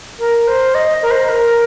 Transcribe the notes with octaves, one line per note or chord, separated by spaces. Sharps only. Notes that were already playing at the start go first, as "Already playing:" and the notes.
A#4
C5
D#5
A#4
C5
A#4